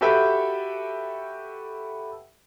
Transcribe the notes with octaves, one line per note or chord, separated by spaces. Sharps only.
F#4 G4 A4 B4 E5 G5